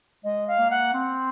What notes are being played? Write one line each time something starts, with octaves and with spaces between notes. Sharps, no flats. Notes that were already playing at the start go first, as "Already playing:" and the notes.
G#3 D#5
F5
A#3
F#5
C4